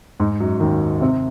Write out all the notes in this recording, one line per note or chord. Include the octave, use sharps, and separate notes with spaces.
G#2 G#3
F#2 F#3
D#2 D#3
C3 C4